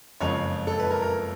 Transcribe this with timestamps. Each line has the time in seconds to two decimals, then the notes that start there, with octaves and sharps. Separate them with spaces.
0.20 F#1 F2 C#3 F3 G#3 C#5
0.67 A4
0.80 B4
0.91 A#4
1.02 A#4